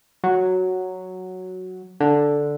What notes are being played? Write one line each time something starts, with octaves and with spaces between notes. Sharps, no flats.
F#3
D3